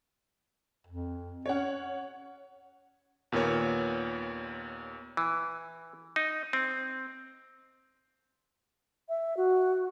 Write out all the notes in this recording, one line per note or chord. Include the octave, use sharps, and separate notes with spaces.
F2
C#4 C#5 F#5
D#2 A#2 B3 A#4 C#5
E3
D#4
C4
E5
F#4